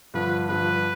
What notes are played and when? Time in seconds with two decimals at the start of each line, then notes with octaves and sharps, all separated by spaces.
0.14 G2 D3 F3 B4
0.49 G2 D3 F3 B4